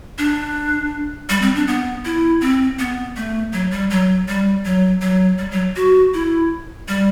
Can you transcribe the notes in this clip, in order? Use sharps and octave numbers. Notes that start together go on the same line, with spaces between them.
D4
G3
C4
D4
B3
E4
C4
B3
A3
F#3
G3
F#3
G3
F#3
F#3
G3
F#3
F#4
E4
G3